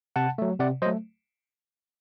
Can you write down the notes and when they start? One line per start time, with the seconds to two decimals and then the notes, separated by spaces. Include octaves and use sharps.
0.16 C3 F#5 A5
0.38 F#3 A3
0.60 C3 D5 F#5
0.82 F#3 C5 D#5
0.86 A3